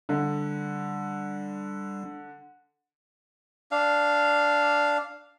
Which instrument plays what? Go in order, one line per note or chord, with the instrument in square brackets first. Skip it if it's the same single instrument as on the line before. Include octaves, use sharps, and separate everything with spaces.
[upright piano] D3 [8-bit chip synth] G3 D4
[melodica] D4 F5